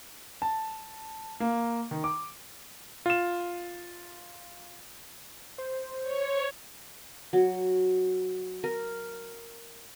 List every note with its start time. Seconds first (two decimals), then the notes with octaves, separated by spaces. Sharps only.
0.42 A5
1.40 A#3
1.91 D#3
2.04 D6
3.06 F4 E7
5.58 C5
6.02 C#5
7.33 F#3
8.64 A#4